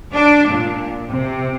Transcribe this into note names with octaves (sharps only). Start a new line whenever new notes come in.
D4
A#2
C3